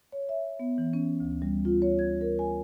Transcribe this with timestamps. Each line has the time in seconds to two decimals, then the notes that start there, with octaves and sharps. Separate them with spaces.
0.12 C#5
0.29 E5
0.60 B3
0.78 E3
0.93 C#4
1.20 D2
1.42 G3
1.65 F4
1.82 C#5
1.99 G#6
2.21 A#4
2.39 G#5